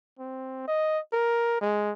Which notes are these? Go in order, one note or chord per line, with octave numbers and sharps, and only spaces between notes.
C4
D#5
A#4
G#3